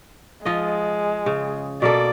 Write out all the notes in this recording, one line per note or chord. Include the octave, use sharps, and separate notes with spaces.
F3 G#3 F4 D#5
C#3
B2 A#3 A4 D5